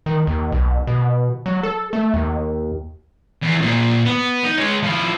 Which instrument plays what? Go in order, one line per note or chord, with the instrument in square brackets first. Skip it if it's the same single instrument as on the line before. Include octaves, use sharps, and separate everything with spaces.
[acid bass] D#3
D#2
B1
B2
F#3
A4
A3
D#2
[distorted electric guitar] E2
A#2 C5
B3
D#4
G#3 C#5
F3 E4